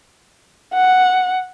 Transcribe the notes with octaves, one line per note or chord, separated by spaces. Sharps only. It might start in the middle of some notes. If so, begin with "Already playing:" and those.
F#5